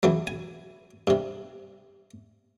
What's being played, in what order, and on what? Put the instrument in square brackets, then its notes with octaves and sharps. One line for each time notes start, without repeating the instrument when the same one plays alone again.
[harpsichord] C#2 E3 F#3
G#5
G2 C3